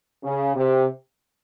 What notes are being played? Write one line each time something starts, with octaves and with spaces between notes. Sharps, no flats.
C#3
C3